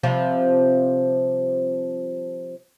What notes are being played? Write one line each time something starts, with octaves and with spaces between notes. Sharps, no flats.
C3 F3 G3